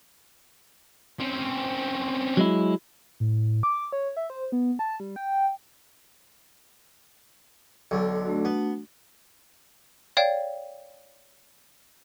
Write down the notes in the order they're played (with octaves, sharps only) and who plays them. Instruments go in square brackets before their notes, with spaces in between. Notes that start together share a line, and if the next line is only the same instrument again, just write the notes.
[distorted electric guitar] C4 C#4
[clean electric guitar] F#3 G#3 E4
[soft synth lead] A2
D6
C#5
E5
C5
B3
A5
G3
G5
[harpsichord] B1 D3
[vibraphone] A3 D4 F#4
[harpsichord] B3
[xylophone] C#5 D5 F5 G5